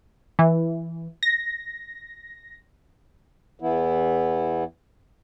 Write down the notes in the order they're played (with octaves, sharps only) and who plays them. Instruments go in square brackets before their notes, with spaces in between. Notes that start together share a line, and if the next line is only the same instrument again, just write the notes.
[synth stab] E3
A#6
[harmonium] E2 E3 B3 E4